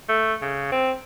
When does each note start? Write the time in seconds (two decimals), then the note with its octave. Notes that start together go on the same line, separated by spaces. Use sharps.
0.09 A3
0.42 C#3
0.72 C4